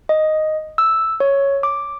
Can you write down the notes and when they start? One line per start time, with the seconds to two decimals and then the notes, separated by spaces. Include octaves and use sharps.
0.09 D#5
0.78 E6
1.20 C#5
1.63 D6